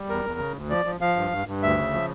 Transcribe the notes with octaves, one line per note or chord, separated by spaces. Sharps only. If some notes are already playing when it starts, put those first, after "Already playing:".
Already playing: G3
E2 A#4
E2
C#3
D2
F3 D5
F3
F3 F5
G2
G2
G2
D2 E5
C#3
F3